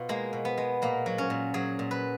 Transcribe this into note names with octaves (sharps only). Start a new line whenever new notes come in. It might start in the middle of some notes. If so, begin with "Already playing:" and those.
Already playing: B2 F4
G#3 A#3
B2
B3
G#3
A#2 A#3
F#3
C#4
A#2
F#3 G#4
A#2
B4